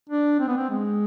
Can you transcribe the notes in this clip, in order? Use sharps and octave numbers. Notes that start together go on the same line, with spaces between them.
D4
C4
B3
C4
G#3